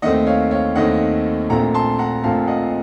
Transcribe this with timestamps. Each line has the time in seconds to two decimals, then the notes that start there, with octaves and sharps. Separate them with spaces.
0.02 D#2 D#3 A3 C4 D#5 F#5
0.26 C#5 F5
0.51 C#5 F5
0.76 D#2 D#3 A3 C4 D#5 F#5
1.49 A#1 A#2 A3 C4 F#5 A#5
1.75 A5 C6
1.99 F#5 A#5
2.24 A#1 A#2 A3 C4 F5 A5
2.47 D#5 F#5